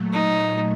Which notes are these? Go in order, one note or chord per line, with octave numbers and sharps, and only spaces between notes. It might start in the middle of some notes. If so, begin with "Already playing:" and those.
Already playing: A#2 F#3 A3
D#4